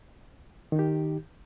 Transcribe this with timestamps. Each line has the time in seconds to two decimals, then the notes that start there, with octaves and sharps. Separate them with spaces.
0.72 D#3
0.76 D#4
0.79 G4